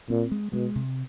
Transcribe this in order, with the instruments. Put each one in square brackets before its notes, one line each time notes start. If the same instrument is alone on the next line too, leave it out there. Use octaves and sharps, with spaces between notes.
[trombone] A#2 [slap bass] C4
[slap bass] G#3
[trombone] B2 [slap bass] G#3
[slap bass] C3